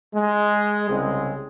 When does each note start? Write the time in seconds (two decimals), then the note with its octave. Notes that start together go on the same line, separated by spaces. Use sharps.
0.15 G#3
0.90 C2 C#3 G#3 C4